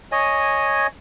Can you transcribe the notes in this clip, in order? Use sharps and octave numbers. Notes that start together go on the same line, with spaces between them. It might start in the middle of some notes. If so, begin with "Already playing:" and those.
C#5 D#5 G#5